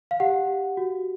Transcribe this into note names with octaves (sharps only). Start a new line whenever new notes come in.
F5
G4 F#5
G4
F#4